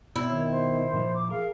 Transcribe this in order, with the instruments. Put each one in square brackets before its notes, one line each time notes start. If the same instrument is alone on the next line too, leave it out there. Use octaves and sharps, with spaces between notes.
[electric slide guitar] B2 C4 [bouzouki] E4 [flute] E6
[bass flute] D#3 [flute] C#5
[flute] C5
[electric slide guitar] A#2 F3
[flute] D6
[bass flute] G#4 [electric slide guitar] A#4 [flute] F5